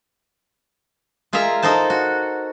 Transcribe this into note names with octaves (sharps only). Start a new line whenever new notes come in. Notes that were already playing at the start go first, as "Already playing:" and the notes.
G#3 F4 G#4 A#4 E5 A#5
D#4 A4 A#4 C5 A5
F#4